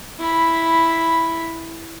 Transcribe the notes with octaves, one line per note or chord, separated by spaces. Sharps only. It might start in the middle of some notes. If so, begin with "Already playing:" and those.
E4 B5